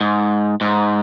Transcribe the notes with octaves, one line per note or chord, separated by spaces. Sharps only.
G#2
G#2